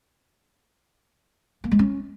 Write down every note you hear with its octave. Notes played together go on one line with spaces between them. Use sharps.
A#3
G#3
C#4